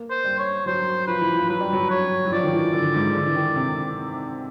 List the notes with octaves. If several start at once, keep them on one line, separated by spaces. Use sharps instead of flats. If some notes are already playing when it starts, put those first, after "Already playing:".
Already playing: A#3
C5
G3
C#5
F#3 C5
F3 B4
E3
F3
F#3 B4
G3
F#3
C#5
F#3
F3 D5
D#3
E3
D3
G#2
D3
E3
D#3
C3